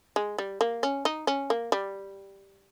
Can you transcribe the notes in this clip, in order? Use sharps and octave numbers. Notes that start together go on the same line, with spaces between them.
G#3
G3
A#3
C#4
D#4
C#4
A#3
G3